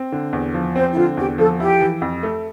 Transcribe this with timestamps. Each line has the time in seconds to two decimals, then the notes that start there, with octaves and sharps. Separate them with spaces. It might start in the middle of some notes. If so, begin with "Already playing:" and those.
Already playing: C4
0.12 D3
0.33 E2
0.54 F3
0.76 C4 C5
0.93 E4
0.96 D3 F4
1.17 E2 G4
1.38 F3 A4
1.60 E4 G4
1.81 E3
2.02 F2
2.23 A3